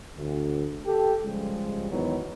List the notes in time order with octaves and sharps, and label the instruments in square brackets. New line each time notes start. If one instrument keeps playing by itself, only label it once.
[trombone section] D2
G4 A4
C#2 F3 G3 G#3
E2 G#2 D#3 F#3 B3